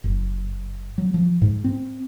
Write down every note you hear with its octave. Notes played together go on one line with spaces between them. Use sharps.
F#1
F#3
F3
G#2
C4